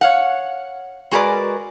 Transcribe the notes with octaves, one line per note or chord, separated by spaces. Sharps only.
C#5 F5 F#5
G#3 F#4 G#4 A#4 B4 D5